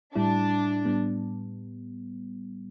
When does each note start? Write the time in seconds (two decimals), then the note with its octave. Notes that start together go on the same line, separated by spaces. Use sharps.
0.15 A2 G3 D4 E4
0.85 A2 G3 B3